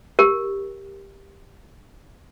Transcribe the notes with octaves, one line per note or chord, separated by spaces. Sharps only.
G4 A#4